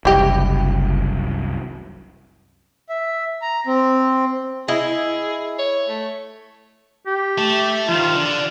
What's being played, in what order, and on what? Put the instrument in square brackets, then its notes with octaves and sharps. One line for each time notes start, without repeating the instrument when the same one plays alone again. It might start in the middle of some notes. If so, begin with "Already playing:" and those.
[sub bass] F#1 [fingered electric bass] C2 F#2 [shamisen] E3 G4 D#5
[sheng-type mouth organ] E5
A#5
C4
[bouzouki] E4 D#5 [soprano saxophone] G#4
[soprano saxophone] C#5
A3
[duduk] G4
[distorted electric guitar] A3
[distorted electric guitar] D#3 F3 [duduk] F4
[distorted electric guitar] D3